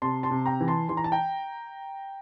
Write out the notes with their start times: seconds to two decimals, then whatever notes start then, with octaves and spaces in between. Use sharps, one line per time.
0.02 C3 A5 C6
0.23 A5 C6
0.31 C3
0.46 G5 A#5
0.61 E3
0.68 A5 C6
0.89 E3 C6
0.97 A#5
1.04 A5
1.12 G5 A#5